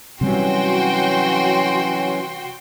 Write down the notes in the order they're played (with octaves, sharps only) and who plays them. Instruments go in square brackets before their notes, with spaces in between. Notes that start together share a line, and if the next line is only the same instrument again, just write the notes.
[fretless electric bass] C3 G3 [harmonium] E3 F#3 C#4 [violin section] F#4 G5 C6